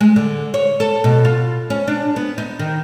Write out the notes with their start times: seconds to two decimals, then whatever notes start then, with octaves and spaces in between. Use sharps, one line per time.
0.01 G#3
0.16 D3
0.54 C#5
0.80 A4
1.04 B2
1.25 F4
1.70 C#4
1.88 D4
2.16 B3
2.38 D#4
2.59 D#3